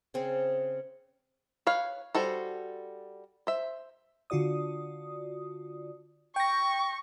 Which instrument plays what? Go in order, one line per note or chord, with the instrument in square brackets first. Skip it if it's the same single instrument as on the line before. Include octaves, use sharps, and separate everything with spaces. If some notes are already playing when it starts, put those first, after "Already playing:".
[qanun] C#3 C4 G#4
[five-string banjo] B4 C#5 F5
G3 F#4 A4 C5
C5 E5
[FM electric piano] D3 F4 F#4 D5 D#6
[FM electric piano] G5 A#6 [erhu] C#6